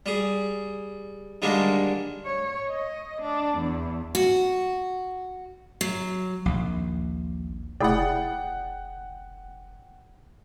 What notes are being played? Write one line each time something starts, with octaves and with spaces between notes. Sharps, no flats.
G3 G#4
D3 D#3 G3 G#3 A#3 D4
C#5
D#5
D4
E2
F#4
F#3
A#1 D#2
F1 E4 G#4 D5 F#5 G5